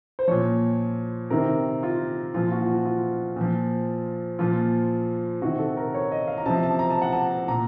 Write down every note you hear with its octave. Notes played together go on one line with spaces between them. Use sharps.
C5
A#2 F3 C#5
C3 D#3 A#4
F4
A#2 F3 F4
F#4
F4
F#4
F4
A#2 F3
A#2 F3 F4
C3 D#3 F#4
A4
A#4
C#5
D#5
F5
A#5
C3 F3 A5
A5
A#5
A5
F#5
A5
A#2 A#5